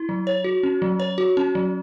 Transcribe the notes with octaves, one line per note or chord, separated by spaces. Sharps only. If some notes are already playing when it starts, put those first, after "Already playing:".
Already playing: E4
F#3
C#5
F#4
C#4
F#3
C#5
F#4
C#4
F#3